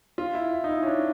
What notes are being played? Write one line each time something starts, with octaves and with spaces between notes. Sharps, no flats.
F4
E4
E4
D#4
E4
C#4
D4